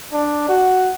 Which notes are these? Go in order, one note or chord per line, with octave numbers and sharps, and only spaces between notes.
D4
F#4